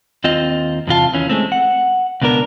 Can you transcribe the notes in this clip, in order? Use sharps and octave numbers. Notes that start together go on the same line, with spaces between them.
D#2 C4 F4 D#5
E2 C3 F4 A5
D#2 E3 C#4
G#3 A3 C4
F#5
C#2 B2 B3 D4 A#4